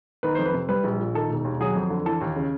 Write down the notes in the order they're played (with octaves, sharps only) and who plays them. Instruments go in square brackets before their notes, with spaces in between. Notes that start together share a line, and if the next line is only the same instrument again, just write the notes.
[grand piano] D#3 B4
F2 C5
B4
C3
G3 B4
A#1
A#2
D#3 A4
E1
D#2
F#3 G#4
F2
D3
E3 A4
D#2
C#3